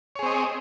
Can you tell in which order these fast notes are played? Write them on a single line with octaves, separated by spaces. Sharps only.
C#5 G#4 C4 D#5